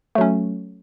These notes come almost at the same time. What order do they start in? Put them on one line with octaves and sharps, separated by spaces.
A3 F#3 C#4